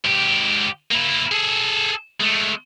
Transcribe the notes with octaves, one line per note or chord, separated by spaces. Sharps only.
G#2 G4
A#3 E4
G#4 A4
G#3 A3